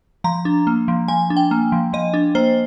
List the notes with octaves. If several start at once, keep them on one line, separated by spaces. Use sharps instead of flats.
F3 A#5
D4
A#3
F3
F3 G#5
D4
G5
A#3
F3
F3 D#5
D4
A#3 C5